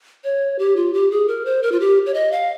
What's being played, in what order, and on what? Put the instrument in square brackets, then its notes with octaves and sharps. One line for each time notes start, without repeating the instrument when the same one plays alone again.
[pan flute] C#5
G4
F4
G4
G#4
A#4
C5
A#4
F4
G4
C#5
D#5
F5